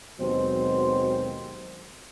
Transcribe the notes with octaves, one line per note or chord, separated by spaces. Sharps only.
D#2 B2 F#3 G#3 C4 C5